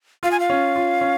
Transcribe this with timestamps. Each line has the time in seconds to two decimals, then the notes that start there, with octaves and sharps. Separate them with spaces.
0.23 F4 F5
0.31 G#5
0.40 F5
0.50 C#4
0.76 F4
1.01 C#4